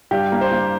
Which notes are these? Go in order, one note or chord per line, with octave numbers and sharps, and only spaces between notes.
G2 G4
A#3
C5
A#3